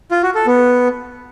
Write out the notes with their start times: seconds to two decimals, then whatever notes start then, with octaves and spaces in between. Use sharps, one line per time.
0.11 F4
0.23 F#4
0.35 A4
0.46 B3